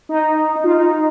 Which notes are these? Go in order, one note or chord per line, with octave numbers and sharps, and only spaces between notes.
D#4
D#4
F4
D#4